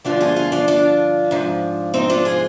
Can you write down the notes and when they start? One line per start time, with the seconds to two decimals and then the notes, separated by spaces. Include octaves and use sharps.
0.05 G2 D3 F3 D4 F4
0.21 F4 G#4
0.36 F4 G#4
0.52 D4 F4
0.68 D4 F4
1.31 G#2 F3
1.94 C4 D#4
2.10 D4 F4
2.25 F4 G#4